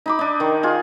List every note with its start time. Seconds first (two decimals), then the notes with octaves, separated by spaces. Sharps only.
0.06 D#4 B5 D6
0.19 D4 D#4
0.40 D#3
0.63 F4 G#4